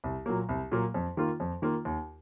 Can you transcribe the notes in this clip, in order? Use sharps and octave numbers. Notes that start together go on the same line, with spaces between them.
C2
A#2 F#3 A#3
C2
A#2 F#3 A#3
F2
D#3 A#3 F4
F2
D#3 A#3 F4
D#2